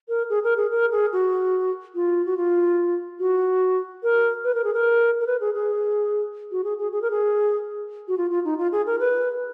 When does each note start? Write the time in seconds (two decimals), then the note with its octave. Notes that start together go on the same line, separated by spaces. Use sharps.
0.09 A#4
0.30 G#4
0.44 A#4
0.57 G#4
0.71 A#4
0.91 G#4
1.13 F#4
1.95 F4
2.25 F#4
2.37 F4
3.20 F#4
4.03 A#4
4.44 B4
4.54 A#4
4.64 G#4
4.74 A#4
5.20 A#4
5.27 B4
5.41 G#4
5.55 G#4
6.52 F#4
6.64 G#4
6.79 G#4
6.92 G#4
7.02 A#4
7.11 G#4
8.08 F#4
8.17 F4
8.30 F4
8.45 D#4
8.58 F4
8.72 G#4
8.86 A#4
9.00 B4